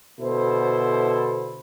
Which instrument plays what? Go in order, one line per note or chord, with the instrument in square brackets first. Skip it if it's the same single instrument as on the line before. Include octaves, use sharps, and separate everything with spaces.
[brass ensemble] B2 D3 E4 A4 C5